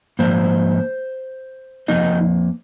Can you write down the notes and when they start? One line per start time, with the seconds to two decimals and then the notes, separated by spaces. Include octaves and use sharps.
0.19 G#2 F3 A#3 C5
1.88 F2 F3 A#3 D#4 D#5